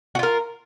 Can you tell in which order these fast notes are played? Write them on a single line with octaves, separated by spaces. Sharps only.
F#4 F4 A#4